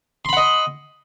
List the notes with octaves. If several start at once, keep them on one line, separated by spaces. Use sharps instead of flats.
D#5 F#5 B5 C6